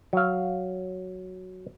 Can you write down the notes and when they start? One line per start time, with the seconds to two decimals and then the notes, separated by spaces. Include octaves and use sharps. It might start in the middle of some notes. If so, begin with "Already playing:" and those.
0.13 F#3 F5